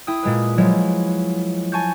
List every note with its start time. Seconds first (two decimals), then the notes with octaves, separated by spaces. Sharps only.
0.07 E4 G5 D#6
0.23 A#2 G#3 B4
0.58 F3 F#3 G#3 E4
1.72 G#5 A5 C#6 G6